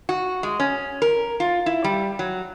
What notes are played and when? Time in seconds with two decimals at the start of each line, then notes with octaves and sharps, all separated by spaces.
0.09 F#4
0.43 G#3
0.60 C#4
1.02 A#4
1.40 F4
1.66 E4
1.84 G3
2.19 F#3